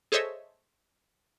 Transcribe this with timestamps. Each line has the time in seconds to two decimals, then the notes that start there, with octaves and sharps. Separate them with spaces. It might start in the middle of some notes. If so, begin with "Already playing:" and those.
0.12 G#4 A4 C5 C#5 D#5 E5